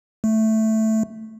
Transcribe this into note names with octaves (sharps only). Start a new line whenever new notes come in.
A3